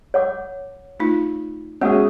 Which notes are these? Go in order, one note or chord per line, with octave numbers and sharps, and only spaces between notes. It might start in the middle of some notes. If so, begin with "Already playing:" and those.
C#5 F#5 D6
A3 D#4 F4
G#3 A#3 B3 C#4 F#4 G#4 E5 F#5